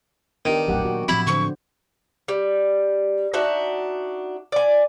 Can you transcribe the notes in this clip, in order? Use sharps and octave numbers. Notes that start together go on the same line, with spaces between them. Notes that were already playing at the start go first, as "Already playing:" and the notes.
D#3 B3 D4 G4
D#1 A#1 A2 F#3 G4 F#5
A#2 F#4
A2 F3 C4 E4 B5
D3 C5 C#6
G3
D4 D#4 F#4 E5
D5 G#5